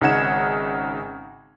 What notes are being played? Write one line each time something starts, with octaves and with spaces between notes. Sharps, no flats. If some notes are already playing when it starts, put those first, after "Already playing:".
G#1 C#3 D#4 F#5 G#6 E7